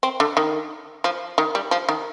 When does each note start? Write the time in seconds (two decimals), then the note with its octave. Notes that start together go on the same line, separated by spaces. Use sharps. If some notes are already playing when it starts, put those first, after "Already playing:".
0.03 C4
0.20 D3
0.37 D#3
1.04 F3
1.38 D#3
1.55 G3
1.71 F3
1.89 D#3